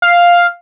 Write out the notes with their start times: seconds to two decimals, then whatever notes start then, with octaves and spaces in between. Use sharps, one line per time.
0.02 F5